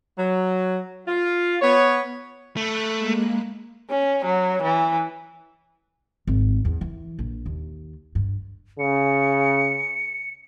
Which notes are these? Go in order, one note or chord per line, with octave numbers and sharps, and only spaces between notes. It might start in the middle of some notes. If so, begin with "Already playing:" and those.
F#3
F4
B3 C#5
A3 B5 F#6
G#3 A#3
C#4
F#3
E3
G#1
E2
E3
A#1
D#2
G2
C#3 C#7